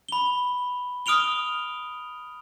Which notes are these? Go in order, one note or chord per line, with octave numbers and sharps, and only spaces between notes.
B5 G7
D#6 F6 D7 F7 G7